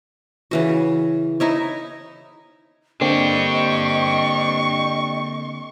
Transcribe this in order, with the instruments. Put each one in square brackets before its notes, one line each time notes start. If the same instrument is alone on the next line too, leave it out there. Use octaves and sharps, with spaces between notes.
[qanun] C#3 E3 F#4
D#4 E4 C#5
[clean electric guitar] D3 A#3 C4 [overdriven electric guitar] D4 G4 [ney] D#5 [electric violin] C#6